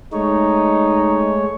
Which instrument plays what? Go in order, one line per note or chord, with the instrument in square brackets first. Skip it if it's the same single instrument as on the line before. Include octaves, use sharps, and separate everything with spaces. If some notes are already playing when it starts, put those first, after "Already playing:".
[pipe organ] G#3 A3 C#5 [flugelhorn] D#4